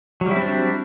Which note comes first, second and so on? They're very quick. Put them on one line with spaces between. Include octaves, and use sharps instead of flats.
F#3 G3 E4 C4 D4